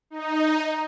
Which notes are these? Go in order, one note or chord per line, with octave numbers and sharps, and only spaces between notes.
D#4